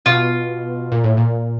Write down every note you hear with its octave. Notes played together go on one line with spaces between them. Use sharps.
B2 F4
A#2
A2
A#2